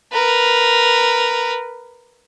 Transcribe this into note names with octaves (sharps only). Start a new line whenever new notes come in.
A#4 B4